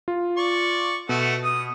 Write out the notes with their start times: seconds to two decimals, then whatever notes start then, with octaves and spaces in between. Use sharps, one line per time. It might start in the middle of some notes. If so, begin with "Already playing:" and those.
0.08 F4
0.37 D5 C#6
1.09 B2 A3 F#4
1.44 D#6